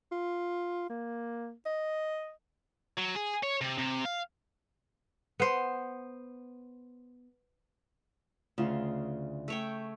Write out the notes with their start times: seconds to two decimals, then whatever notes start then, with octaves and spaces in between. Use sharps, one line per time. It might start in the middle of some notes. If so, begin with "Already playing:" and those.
0.12 F4
0.90 A#3
1.66 D#5
2.97 F#3
3.15 G#4
3.43 C#5
3.61 C3
3.78 C3
4.05 F5
5.40 B3 C5
8.58 D2 C#3 F4
9.48 A3 C#5 G5